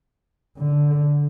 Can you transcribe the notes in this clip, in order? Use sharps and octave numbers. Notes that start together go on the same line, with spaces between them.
D3